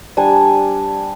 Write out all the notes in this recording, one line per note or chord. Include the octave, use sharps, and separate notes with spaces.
G3 D4 G#5